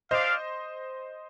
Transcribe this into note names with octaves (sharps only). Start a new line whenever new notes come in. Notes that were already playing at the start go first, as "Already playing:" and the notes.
D4 G4 C5 D5 D#5 F5